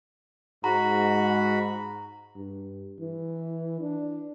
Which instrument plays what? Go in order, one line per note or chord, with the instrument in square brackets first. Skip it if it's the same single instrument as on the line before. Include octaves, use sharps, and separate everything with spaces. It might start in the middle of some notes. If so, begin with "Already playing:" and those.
[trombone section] G#2 [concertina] F#4 B5 [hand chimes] A#5
[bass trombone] G2
E3
D4